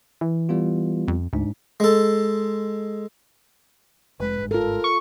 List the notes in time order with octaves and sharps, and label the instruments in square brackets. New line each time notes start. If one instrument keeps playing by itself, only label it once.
[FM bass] E3
[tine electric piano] G3 B3 F4
[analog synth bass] F2
[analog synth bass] D2 [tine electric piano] G#2 D4
[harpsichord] G#3 A4
[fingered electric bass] F1 G#3 [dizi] B4
[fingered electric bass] G1 G#2
[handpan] F4 A4 [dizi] A#4
[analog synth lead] C#6